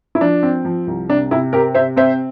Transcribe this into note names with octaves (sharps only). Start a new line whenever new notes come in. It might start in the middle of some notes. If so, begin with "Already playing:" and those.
E4
F3 D4
C4
F3
C2
C3 D4
C3 E4
C4 G4 A#4
C3 C5 E5
C4 C5 E5